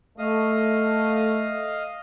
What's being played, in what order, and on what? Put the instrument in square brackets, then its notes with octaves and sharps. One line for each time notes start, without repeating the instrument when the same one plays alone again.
[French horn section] A3 [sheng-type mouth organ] D#5 F5 D#6